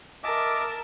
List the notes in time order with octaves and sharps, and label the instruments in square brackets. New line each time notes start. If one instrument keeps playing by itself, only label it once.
[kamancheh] A#4 A5 [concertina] D#5 E5 D6